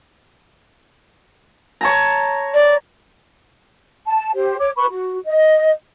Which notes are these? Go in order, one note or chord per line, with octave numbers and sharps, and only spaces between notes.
C#5 A5 A#5
D5
A5
G4 C5
C#5 D6
B4 B5 C#6
F#4
D#5